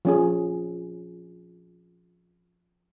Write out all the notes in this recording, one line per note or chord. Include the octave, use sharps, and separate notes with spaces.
F3 C#4 G#4